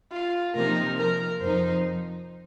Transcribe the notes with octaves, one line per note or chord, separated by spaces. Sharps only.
F4
C3 F3 A#3 D#4 A#4
A#4
F2 F3 D#4 C5